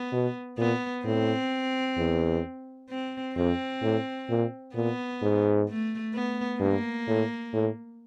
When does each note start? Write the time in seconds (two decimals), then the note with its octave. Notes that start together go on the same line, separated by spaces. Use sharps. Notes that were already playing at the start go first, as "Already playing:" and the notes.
Already playing: B3
0.13 B2
0.58 A#2 B3
1.05 A2 C4
1.98 E2
2.90 C4
3.36 F2 C4
3.82 A2
4.30 A#2
4.75 A#2 B3
5.22 G#2
5.69 A3
6.14 B3
6.60 G2 A#3
7.08 A2
7.54 A2